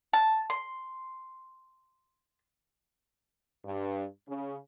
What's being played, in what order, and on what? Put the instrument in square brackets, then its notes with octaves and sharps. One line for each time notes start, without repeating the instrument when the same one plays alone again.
[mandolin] A5
C6
[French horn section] G2
C#3